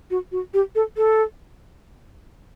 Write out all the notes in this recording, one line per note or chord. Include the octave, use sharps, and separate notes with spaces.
F#4
F#4
G4
A4
A4